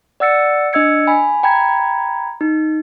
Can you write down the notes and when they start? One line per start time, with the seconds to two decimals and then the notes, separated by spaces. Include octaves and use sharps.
0.20 D5 F#5 E6 A6 C#7
0.73 D4 D#5 E6 G#6 C#7
1.07 G#5 B5
1.43 G5 A#5 B5 G#6
2.41 D#4